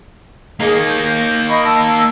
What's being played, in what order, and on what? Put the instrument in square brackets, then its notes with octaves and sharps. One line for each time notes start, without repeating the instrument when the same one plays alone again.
[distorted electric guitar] A#3 D#4 [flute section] G#4
[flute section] G6
D#5 B5 C#6
A5 E6